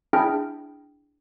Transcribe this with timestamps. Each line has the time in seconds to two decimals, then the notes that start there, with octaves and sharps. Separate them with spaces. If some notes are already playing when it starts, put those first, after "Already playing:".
0.13 D4 E4 G#4 E5 G5 F6